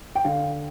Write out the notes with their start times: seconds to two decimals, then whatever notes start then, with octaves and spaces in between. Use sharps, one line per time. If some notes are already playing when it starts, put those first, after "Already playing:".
0.15 G5
0.25 D3 F5